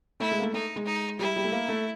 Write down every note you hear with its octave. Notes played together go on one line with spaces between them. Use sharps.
A3 E4
G#3
A#3
A3
A3 D#4
G#3
D#4
G3 E4
G3
A3
A#3
A3